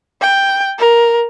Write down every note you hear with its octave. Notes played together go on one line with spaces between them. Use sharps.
G5
A#4